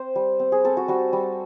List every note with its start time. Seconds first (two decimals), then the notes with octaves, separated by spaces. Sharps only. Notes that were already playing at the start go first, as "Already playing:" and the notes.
Already playing: C4 C5
0.16 G3
0.40 C4
0.52 G#4
0.64 C4 A4
0.77 F#4
0.88 G3 F#4
1.13 G3